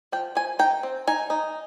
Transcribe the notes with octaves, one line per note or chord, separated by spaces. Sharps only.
F3 G5
F3 G#5
D#4 G5
C4
D#4 G#5
D#4